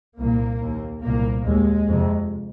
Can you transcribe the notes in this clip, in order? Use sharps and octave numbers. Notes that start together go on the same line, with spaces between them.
C2 A#2 A#3
D#2
C2 A#2 A#3
D#2 G#3
F2 C3